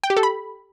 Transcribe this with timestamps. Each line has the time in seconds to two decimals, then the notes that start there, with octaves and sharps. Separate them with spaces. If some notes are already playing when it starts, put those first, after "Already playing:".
0.04 G5
0.10 G4
0.17 A4
0.23 B5